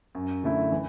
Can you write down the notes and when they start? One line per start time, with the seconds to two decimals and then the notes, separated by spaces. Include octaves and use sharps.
0.15 F#2
0.44 D3 A3 E4
0.72 E3